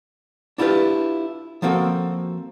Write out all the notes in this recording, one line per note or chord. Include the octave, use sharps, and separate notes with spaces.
D4 E4 F4 G4 B4
F3 A#3 C4 F#4 A4